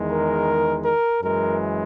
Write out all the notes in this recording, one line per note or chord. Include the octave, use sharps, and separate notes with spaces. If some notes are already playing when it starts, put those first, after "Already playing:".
Already playing: E2 D#3 G#3
A#4
A#4
F#2 E3 G#3 A#4